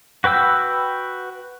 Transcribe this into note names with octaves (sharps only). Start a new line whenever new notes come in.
F#4 B4 G5 E6